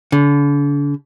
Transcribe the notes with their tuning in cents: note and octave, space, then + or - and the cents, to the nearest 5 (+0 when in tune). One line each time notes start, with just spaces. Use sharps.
D3 -40